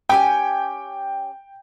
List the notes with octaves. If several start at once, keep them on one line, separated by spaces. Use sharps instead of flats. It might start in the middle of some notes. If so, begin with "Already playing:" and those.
C#4 G4 G5 G#5